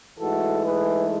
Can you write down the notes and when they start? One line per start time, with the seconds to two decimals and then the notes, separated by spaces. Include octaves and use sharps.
0.19 G#2 E3 A3 F#4 A4
0.63 G#4 B4